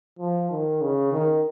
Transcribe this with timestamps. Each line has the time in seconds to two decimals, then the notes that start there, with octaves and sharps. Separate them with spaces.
0.19 F3
0.51 D#3
0.82 C#3
1.12 D#3